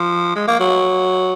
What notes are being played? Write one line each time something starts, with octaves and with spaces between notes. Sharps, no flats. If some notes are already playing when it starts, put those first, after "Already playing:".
Already playing: F3
G#3
A#3
F#3